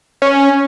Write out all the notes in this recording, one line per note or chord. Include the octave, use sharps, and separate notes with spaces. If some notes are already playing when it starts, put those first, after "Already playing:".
C#4